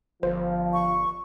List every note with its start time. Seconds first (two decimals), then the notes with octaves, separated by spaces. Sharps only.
0.23 G1 F3 C5
0.73 C#6